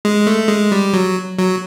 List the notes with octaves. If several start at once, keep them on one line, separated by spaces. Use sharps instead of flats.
G#3
A3
G#3
G3
F#3
F#3